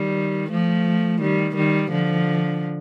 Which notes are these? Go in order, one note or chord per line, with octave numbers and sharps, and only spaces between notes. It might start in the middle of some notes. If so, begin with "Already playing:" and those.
Already playing: D#3 G3
F3 A3
D#3 G3
D#3 G3
D3 F3